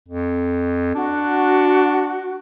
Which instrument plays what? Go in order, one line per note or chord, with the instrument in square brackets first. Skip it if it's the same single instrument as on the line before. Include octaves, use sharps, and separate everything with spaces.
[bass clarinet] F2
[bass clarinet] D4 [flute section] F#4